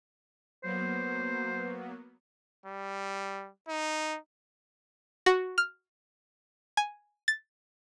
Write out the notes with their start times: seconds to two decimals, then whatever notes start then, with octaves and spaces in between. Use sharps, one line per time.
0.63 F#3 A#3 B3 C5
2.66 G3
3.69 D#4
5.26 F#4
5.58 F6
6.77 G#5
7.28 A6